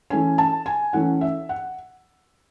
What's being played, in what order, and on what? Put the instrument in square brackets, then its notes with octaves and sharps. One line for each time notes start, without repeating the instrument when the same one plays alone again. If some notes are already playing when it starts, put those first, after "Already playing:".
[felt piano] E3 A3 C#4 G#5
A5
G#5
E3 A3 C#4 F#5
E5
F#5